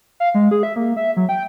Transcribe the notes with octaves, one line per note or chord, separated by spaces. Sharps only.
F5
G#3
G#4
E5
A#3
E5
F#3
G5